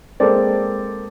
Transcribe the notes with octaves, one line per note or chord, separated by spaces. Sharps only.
G#3 A#3 C4 A4 D5